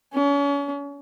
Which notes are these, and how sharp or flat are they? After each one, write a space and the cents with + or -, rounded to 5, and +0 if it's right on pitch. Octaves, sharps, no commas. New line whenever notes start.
C#4 +35